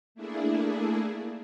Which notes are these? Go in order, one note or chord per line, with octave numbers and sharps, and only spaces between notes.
A3 A#3 D4 E4 G#4